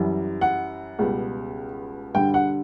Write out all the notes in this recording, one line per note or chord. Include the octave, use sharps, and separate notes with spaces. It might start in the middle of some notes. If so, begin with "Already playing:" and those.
Already playing: F#2 E3 G3
F#5
C#2 B2 G3
G2 D3 G3 G5
F#5